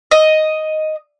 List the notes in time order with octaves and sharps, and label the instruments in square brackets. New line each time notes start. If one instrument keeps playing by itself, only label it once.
[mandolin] D#5